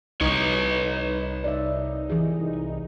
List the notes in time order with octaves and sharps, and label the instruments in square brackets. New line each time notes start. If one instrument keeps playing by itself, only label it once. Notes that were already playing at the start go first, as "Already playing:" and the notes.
[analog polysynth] C2 D#4 [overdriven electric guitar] B4 C#5
[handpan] D5 E5
E3 G#4